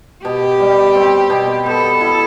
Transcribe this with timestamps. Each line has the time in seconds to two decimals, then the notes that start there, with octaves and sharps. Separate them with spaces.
0.24 B2 G4
0.60 G3
0.95 C4
1.30 B2
1.66 B3 A4
2.01 E4